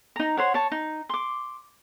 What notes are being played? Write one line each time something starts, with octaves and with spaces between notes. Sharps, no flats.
D#4 A#5
C5 C#5 F#5
C#5 A5
D#4
C6 D6